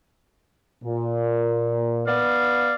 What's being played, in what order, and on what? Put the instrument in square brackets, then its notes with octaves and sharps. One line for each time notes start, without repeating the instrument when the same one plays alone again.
[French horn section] A#2
[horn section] B3 D5 F5